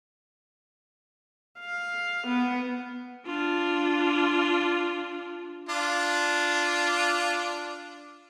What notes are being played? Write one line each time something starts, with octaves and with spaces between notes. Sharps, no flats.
F5
B3
D4 F4
D4 F4